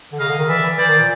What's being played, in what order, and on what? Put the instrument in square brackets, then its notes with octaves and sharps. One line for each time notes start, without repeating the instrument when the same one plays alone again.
[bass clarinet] D3
[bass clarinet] C#3 [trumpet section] D#5 F5
[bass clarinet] D3
D#3
[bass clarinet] E3 [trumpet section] D5 E5
[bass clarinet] E3
[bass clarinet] E3 [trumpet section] C5 D5
[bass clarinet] D#3
A#2